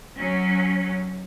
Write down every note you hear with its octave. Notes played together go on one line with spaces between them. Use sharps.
F#3 C#4